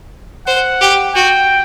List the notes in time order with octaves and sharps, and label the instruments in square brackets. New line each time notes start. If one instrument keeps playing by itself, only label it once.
[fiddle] C5 [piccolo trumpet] F#5
[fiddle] G4
[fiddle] F#4 [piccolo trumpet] G5